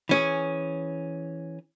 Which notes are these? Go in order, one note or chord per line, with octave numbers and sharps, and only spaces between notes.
E3 C#4 G#4